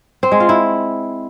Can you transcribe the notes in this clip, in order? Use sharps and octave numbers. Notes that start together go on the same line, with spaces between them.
C4
G#3
F4
E4